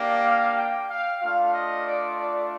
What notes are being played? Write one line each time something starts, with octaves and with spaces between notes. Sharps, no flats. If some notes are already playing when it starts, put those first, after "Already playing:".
Already playing: A#3 D4 G4
F5
G5
F5
A3 D4 F4 F5
D#5
D5
D5